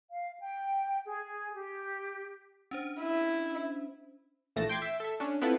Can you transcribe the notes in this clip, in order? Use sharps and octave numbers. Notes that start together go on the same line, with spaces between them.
F5
G5
G#4
G4
C#4 D4 C5
E4
A#1 E3 F3 A3 A5 A#6
G5 C6 D6 G6 G#6
E5
A4 E5
C#4 D4
B3 C4 E4 F4 A4 B4